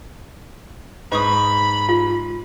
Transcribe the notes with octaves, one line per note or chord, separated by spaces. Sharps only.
G#2 B4 B5 C#6 D#6
F4